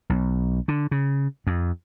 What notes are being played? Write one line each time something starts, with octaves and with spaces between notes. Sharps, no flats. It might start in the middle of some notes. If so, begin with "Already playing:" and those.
B1
D3
C#3
F2